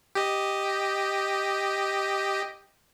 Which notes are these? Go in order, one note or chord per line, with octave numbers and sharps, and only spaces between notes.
G4 D#5